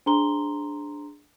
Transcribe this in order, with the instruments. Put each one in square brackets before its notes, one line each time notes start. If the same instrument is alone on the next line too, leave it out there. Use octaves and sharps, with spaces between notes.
[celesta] D4 G#4 C5 A#5 C6 G7